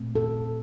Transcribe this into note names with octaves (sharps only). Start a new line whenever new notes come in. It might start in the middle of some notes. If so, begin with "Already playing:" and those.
Already playing: A#2 A3 C4
A4